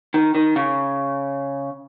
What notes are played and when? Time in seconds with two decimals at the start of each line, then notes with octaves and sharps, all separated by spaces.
0.14 D#3
0.35 D#3
0.56 C#3